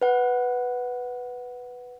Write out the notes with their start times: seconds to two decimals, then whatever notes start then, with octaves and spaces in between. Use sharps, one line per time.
0.01 B4 F#5